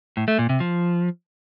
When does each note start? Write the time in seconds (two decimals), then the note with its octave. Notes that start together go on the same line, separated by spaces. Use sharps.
0.17 A2
0.28 A3
0.39 A#2
0.49 C3
0.60 F3